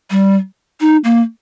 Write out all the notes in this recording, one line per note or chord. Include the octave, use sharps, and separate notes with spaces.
G3
D#4
A#3